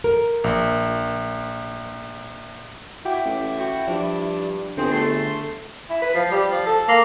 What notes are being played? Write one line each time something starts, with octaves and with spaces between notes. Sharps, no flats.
A#4
A#1
E4 F#4 G5 D6
A1
F#4 G5 C#6
G2 F3 D4
G1 D3 B3 C4 G#4
A3 C6
E4
B4
F3
G3
F3
A4
A#3